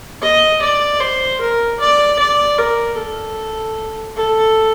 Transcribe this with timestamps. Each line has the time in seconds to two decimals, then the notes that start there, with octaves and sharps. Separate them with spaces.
0.22 D#5
0.62 D5
1.00 C5
1.41 A#4
1.80 D5
2.19 D5
2.58 A#4
2.98 A4
4.17 A4